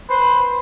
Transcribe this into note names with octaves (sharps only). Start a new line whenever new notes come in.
B4 C5